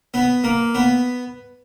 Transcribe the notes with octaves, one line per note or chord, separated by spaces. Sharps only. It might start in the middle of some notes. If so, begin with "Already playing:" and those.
B3
A#3
B3